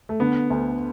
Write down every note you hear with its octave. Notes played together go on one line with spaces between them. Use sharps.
A3
D3 B3
D2